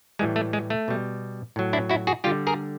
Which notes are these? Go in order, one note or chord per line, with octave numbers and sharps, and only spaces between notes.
A2 E3 G3 G#3
A3
G#3
A3
B2 G3
A2 F#3
D4 E4
E4 F#4
F#4 G#4
D3 G3 F4 G4
G#4 A#4